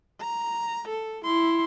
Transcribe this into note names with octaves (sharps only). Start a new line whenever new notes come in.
A#5
A4
E4 C6